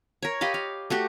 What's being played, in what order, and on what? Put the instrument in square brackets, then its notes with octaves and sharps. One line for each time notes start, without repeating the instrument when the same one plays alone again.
[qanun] A#4 C#5
G4 D#5 F5 B5
F5
A3 F#4 G4